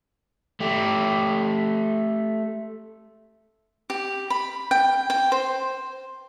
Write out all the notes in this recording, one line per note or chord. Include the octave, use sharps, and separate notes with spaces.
A3 G4
G4
B5
G5
G5
C5